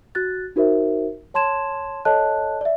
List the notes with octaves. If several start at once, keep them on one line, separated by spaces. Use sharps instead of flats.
F#4 F#6 A6
D#4 F#4 A#4 C5 E5
C#5 A5 C6 G#6 E7
A4 C#5 D#5 A5 F#6
D5 E5